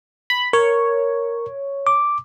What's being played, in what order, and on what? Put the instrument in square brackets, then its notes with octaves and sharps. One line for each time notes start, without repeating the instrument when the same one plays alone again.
[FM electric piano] B5
[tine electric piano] A#4 [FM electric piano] C#5
[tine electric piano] D6